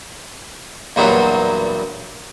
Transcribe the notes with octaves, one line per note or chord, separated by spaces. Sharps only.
E2 G2 A#2 F#3